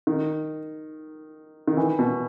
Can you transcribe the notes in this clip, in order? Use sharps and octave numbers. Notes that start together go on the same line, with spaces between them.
D#3
D#3
E3
B2